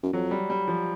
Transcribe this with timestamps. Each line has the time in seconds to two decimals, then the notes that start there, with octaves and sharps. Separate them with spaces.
0.03 F#2
0.13 F2 F#3
0.31 G3
0.50 G3
0.68 F3